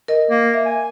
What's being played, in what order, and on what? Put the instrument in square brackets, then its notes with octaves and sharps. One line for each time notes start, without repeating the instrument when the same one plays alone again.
[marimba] A#4 D#5
[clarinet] A#3
[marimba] E5
[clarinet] G#5